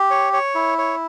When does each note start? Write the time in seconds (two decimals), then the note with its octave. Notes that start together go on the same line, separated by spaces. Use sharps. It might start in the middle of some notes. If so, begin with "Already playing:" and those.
Already playing: G4
0.10 C#5
0.33 C#5
0.55 E4
0.78 C#5